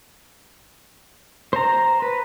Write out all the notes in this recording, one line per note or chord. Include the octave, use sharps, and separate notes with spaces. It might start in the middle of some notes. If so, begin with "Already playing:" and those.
C5 A#5
B4